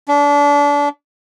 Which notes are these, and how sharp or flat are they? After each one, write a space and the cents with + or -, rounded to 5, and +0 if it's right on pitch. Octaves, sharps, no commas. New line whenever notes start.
D4 -30